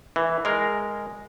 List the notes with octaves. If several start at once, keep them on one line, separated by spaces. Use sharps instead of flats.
E3
G#3 A#4